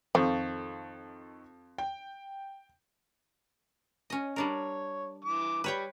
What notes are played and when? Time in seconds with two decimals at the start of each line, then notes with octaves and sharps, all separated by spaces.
0.15 F2 D#3 F3 A4 C#6
1.78 G5
4.10 C#4 D#5
4.36 G3 D4 A#4 C#5
5.24 E3 D6
5.64 G3 B4 C#5 G5